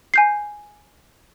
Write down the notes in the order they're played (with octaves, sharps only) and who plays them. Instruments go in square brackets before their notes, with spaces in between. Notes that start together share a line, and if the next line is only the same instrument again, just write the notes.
[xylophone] G#5 G6 C7